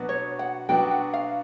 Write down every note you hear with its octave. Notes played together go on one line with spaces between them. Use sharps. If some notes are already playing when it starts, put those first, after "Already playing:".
Already playing: B2 F#3 B3 D4 F#4
C#5
F#5
B2 F#3 B3 D4 F#4 G5
F#5
F5